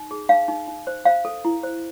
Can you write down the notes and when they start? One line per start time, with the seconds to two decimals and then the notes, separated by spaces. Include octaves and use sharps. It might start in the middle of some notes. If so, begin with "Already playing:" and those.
Already playing: D#4
0.11 G#4
0.29 D#4 F5
0.48 D#4
0.67 D#4
0.87 C5
1.05 C5 F5
1.25 A4
1.45 E4
1.63 C5